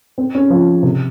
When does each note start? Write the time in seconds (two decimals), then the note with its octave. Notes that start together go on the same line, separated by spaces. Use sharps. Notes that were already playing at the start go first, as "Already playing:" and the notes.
0.18 C4
0.35 C#4
0.50 F3
0.83 C3